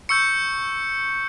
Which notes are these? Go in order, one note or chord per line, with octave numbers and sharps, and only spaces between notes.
C#6 E6 G6 C#7